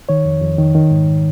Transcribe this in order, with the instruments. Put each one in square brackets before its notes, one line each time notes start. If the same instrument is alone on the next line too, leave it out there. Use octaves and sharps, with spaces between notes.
[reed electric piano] D#3 C#5
F2
F2
D#3
D#3
G#2